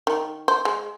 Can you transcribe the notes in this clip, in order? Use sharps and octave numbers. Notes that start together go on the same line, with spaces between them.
D#3
C5
G#3